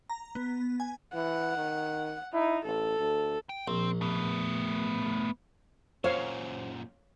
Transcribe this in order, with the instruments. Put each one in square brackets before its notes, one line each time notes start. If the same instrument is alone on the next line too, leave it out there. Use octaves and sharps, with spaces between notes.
[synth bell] A#5
B3
G#5
[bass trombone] E3 [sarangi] F#5
[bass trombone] D#3
[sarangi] D#4 [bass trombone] E4
[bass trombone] A1 [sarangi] A4
[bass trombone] D2
[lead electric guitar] G5
[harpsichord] A#1 [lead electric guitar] C4
[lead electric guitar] A3 B3
[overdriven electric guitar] F#2 A#2 [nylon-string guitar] C5 [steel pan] C#5 F5